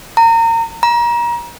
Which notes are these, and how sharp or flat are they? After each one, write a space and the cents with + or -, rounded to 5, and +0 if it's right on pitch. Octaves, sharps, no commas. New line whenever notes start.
A#5 -30
A#5 +30